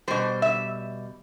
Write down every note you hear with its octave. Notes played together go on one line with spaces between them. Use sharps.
B2 G3 C5
E5